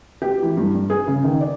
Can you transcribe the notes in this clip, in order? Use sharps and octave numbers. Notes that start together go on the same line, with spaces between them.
G4
E3
G2
G2
G#4
C#3
D#3
D5